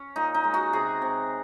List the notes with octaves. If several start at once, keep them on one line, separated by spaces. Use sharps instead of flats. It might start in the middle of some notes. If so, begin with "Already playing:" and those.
Already playing: C#4
A#2 D#4
D#4
G#3
F#4
C3 G#4
C3